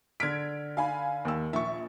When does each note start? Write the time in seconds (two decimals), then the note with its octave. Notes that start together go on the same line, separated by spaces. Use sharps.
0.20 D3 F6 G#6 B6 D7
0.77 F5 G#5 B5
1.25 D#2 E6
1.53 A#1 E5 C#6